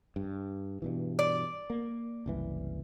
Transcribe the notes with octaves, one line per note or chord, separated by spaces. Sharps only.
G2
G2 B2 E3
D5
A#3
F#1 C2 E3